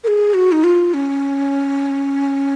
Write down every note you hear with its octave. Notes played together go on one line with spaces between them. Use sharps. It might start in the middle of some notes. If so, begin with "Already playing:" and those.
A#4
G#4
F#4
D#4
F4
C#4